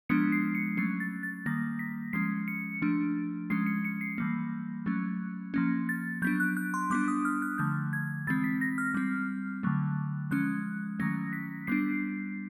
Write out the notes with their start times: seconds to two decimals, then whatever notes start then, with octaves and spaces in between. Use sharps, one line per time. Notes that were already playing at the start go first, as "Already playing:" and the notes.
0.09 F3 G#3 B3 D4 C#7
0.32 C7
0.55 C#7
0.77 F#3 A3 C#4 C7
1.00 A6
1.23 A6
1.46 D#3 G3 A#3 A#6
1.79 B6
2.13 F3 G#3 C#4 C7
2.48 C#7
2.82 F3 A3 D4
3.50 F3 G#3 C#4 C7
3.66 C#7
3.85 C#7
4.01 C7
4.18 E3 G3 A#3
4.86 F#3 A3 C#4
5.54 F3 A#3 C#4
5.89 A6
6.22 F#3 B3 D4 G6
6.40 F#6
6.57 F#6
6.74 C6
6.90 G3 B3 D4 D6
7.08 D#6
7.25 F6
7.42 F#6
7.58 D3 F3 A3 G6
7.93 G#6
8.27 E3 G#3 C4 A6
8.44 B6
8.61 A#6
8.78 F6
8.94 G3 C4
9.63 D3 F#3 A3
10.31 F3 G#3 C#4 F#6
10.99 D#3 F#3 A3 C#4 A#6
11.33 B6
11.67 G3 B3 D4 C7